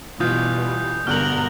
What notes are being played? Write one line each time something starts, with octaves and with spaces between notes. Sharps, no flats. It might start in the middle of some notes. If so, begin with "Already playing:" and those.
B2 E3 G3 F4 D#6 G6
G2 B2 D3 A#4 F6 F#6 F#7